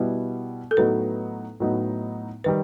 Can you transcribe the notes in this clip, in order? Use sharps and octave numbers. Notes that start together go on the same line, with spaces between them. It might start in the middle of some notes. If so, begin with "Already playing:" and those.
Already playing: B2 G3 B3 E4
A4
A2 F#3 B3 D#4 B4
A2 F#3 B3 D#4
D#3 G3 B4